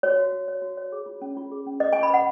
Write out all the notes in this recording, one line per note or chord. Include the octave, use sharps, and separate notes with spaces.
F#4 C#5
F#4
F#4
C#5
F#4
C#5
G#4
F4
C#4
F4
G#4
C#4
B4 D#5
F4 G#5
B5
B4 F#5